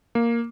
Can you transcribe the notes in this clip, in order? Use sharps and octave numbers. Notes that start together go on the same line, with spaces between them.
A#3